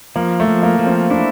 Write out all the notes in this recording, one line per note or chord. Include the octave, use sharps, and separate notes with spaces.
F3 A#3
A3
F3
A#3
F3
C4
D4 E4